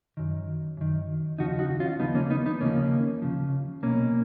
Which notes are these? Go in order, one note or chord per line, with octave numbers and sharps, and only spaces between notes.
F#2 D#3
F#2 D#3
D#2 C#3 F3 D#4 F#4
D#4 F#4
C#4 F4
D#2 C#3 F3 B3 D#4
A#3 C#4
B3 D#4
B3 D#4
D#2 C#3 F3 A#3 C#4
D#2 C#3 F3
B1 B2 A#3 C#4